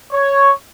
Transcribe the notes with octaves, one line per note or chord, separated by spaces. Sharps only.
C#5